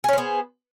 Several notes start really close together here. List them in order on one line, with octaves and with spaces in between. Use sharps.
G#4 C#4 C5 B3